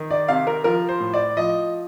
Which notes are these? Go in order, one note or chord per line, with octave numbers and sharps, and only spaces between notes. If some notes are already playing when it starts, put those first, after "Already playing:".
Already playing: D#3
D5
C3 F5
A#4
F3 A#4
C5
A2
D5
F3 D#5